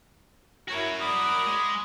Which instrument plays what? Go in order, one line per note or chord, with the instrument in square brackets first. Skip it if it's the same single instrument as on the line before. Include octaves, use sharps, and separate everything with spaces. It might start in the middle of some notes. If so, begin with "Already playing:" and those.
[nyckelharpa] E4 C#5 [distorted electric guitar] F#4 A#4
[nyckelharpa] D5 B5 [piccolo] D#6
[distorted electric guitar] G#3